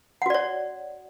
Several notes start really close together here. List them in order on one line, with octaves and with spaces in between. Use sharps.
F#5 F#4 D5 C#5